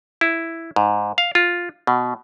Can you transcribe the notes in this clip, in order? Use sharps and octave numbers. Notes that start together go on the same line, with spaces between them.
E4
G#2
F5
F4
B2